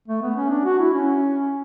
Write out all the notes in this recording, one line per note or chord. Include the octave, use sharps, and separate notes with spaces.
A3
B3
C#4
D4
F#4
E4
C#4